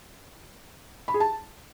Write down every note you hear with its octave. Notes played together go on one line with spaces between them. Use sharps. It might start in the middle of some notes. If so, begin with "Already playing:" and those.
B5
G#4
A5